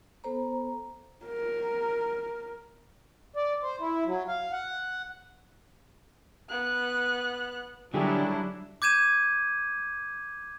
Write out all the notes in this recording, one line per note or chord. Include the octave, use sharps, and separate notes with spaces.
B3 A4 C5 A#5
A#4
D5
C5
E4
F#3
F5
F#5
B3 F#6
D3 F#3 G3 D4 E4 G4 G#4
D6 G6 G#6 D#7 E7